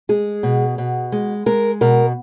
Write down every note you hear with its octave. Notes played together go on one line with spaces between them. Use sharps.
G#3 G#4
B2
B2
G#3
G#3 A#4
B2 A#4